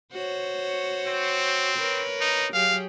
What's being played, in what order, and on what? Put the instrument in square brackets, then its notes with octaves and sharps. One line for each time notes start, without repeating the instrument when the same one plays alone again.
[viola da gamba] F#4 C5 C#5
[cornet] C4
[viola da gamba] A#4 B4 C#5
[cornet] D#4
[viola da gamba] F#3 G4 G#4 [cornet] F5